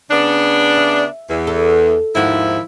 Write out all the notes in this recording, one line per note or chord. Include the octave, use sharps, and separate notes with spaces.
C#3 B3 D4
E5
E2
A4
D#2 G#2 D#3 F3 E4 F#4